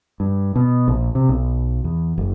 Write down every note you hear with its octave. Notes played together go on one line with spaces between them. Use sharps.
G2
B2
A#1
C3
B1
E2
F#1